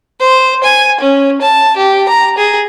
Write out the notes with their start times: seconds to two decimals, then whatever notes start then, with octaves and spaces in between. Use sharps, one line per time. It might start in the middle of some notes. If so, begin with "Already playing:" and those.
0.20 C5
0.64 G#5
1.00 C#4
1.42 A5
1.77 G4
2.08 A#5
2.38 G#4